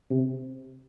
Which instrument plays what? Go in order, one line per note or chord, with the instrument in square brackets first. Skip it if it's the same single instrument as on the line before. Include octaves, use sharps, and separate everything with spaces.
[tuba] C3